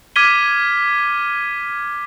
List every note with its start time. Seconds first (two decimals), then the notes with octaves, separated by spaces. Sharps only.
0.16 D6 F6 G#6 B6 D#7 G7